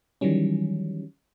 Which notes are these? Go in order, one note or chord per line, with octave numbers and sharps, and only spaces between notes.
D#3 E3 F#3 G3 C#4